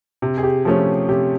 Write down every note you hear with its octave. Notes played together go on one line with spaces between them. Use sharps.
C3
G#4
G4
F3 A3 C#4 G#4
C3 G4